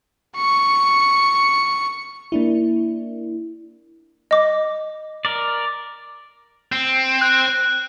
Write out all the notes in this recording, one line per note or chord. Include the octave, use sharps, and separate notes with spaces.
C#6 C#7
A#3 D4 E4
D#5 D6
A#4 D5
C4
F#6